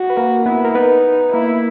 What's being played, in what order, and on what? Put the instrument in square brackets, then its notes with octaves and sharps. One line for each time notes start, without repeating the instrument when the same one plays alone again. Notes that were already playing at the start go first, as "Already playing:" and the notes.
Already playing: [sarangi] F#4
[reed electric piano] B4
A#3 A#4
[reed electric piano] B3 B4 [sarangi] E4
[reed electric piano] A#4
[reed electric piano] B3 B4 [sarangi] D#4
[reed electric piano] A#3 A#4 [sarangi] E4